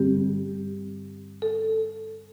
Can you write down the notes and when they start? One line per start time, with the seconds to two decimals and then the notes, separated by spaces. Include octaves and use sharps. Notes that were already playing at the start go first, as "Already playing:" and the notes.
Already playing: G2 D3 G3 C4 G4
1.42 A4